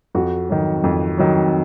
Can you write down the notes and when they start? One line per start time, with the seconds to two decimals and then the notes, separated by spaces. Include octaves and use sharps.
0.15 F2 F#4
0.49 D#3 F#3
0.84 F2
1.18 D#3 F#3